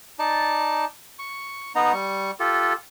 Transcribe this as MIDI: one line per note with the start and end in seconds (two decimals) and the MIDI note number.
0.19 0.85 63
0.19 0.85 74
0.19 0.85 81
1.19 1.72 85
1.75 1.92 59
1.75 1.92 63
1.75 1.92 75
1.75 1.92 82
1.93 2.31 55
1.93 2.31 85
2.40 2.73 65
2.40 2.73 67
2.40 2.73 69